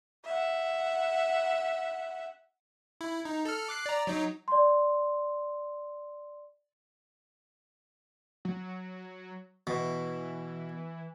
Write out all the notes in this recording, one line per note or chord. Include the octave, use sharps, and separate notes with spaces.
E5 F#5
E4
D#4
A4 F6
D6 F#6 C7
D5 A#5
F#3 D#4
D5 C6
F#3
B2 E3